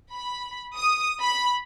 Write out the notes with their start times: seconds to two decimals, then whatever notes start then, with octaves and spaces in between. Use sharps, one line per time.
0.14 B5
0.77 D#6
1.22 B5